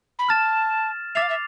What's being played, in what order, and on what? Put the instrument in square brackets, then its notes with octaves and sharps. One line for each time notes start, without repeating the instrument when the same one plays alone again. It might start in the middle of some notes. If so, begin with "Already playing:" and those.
[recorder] B5
[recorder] A5 [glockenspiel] F6 A6 E7
[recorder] E5 [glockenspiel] D6 A6 C7 F7
[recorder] F5
E5